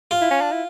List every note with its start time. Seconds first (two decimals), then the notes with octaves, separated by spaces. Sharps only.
0.11 F4
0.21 E4
0.31 C#4
0.41 D4
0.51 E4